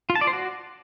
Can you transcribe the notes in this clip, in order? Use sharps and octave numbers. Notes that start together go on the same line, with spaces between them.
F4
A5
D5
C5
F#4